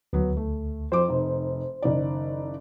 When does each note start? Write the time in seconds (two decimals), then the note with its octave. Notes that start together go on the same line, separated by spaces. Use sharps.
0.13 D2 F#3 B3
0.37 A3
0.92 F2 C5 D6
1.08 F1 D#4
1.82 F#1 D#3 D5